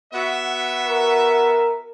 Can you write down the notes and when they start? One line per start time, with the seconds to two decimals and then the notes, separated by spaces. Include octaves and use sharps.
0.12 B3 F#4 E5
0.88 A#4